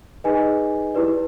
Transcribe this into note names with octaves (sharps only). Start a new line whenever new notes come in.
D#4 G#4 B4 D#5 G#5
E4 G4 B4 D5